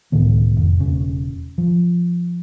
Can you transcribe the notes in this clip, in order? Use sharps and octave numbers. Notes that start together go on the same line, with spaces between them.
C#2 A2 D#3 B3
F1
E1 C#3
F3